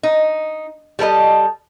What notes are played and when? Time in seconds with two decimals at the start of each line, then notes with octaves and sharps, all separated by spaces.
0.03 D#4
0.99 G3 A4 A#4 D#5